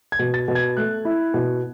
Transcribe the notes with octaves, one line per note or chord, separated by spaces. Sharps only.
G#6
B2
A6
B2
G#6
A3 F#6
E4
B2